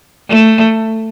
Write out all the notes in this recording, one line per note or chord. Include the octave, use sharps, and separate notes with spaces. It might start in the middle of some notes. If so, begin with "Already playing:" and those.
A3